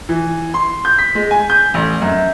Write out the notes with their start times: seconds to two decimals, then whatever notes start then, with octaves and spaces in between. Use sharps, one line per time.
0.09 E3
0.54 C6
0.85 G6
0.98 B6
1.15 G#3
1.31 G#5
1.50 G6
1.74 A1
2.01 F#2